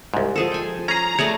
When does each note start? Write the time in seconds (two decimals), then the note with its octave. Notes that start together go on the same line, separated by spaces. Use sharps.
0.14 C2 G#2
0.36 F3 G#4 A4
0.51 G5 G#5
0.88 C#4 G#4 A#5
1.19 A3 G#4 C#5 D5